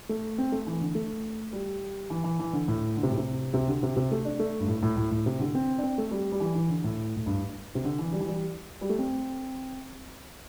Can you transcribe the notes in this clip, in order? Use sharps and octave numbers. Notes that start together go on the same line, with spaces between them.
A3
C4
A3
E3
D3
A3
G3
E3
E3
E3
D3
A2
D3
C3
A2
C3
C3
D3
C3
C3
A3
D4
A3
G2
A2
A2
A2
A2
C3
D3
C4
D4
C4
A3
G3
G3
E3
E3
D3
A2
A2
G2
C3
D3
E3
G3
E3
G3
G3
A3
C4